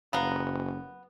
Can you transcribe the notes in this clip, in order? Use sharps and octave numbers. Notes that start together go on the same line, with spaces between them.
F#1 B3 F5 A#5